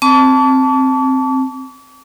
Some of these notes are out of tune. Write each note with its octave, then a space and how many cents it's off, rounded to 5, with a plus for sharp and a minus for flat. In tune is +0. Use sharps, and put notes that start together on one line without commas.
C4 +5 A5 +0 D6 -45